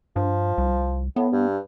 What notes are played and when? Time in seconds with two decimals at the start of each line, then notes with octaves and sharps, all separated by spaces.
0.16 G2 F3
0.58 C2
1.16 A2 B3
1.32 G2